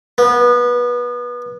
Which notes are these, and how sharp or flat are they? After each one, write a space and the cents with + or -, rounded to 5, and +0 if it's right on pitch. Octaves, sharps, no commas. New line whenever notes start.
B3 -25